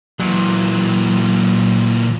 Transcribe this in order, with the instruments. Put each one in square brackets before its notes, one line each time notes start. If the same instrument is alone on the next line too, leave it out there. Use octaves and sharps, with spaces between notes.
[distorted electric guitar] A#2 E3 [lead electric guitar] F#3